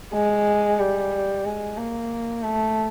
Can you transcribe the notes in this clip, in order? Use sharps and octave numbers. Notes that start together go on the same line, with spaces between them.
G#3
G3
G#3
A#3
A3